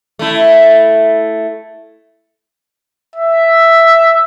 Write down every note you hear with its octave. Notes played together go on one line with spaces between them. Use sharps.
A3 E4
E5